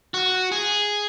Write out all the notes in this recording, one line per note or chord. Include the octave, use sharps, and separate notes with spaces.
F#4
G#4